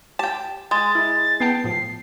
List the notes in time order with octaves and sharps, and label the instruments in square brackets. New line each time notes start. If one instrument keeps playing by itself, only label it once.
[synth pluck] G4 [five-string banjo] G5 A5
[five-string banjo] G#3 [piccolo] A6
[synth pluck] E4
[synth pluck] B3 G5 A5 [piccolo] C7
[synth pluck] A2 F3